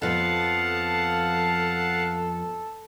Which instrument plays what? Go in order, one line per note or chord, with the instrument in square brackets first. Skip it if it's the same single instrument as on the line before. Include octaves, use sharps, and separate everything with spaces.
[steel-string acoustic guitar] F2 F3 B3 [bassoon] A4 [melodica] F5 F#5 A5